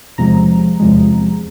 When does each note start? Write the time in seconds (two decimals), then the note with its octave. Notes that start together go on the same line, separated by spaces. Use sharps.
0.18 E2 C3 F3 G#3 A#5
0.80 E2 C3 F3 G#3